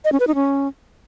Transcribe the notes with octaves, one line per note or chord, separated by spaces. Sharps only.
D#5
C#4
B4
D#4
C#4